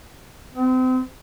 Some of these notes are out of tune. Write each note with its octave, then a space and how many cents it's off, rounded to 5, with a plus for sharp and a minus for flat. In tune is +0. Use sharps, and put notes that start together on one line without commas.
C4 -35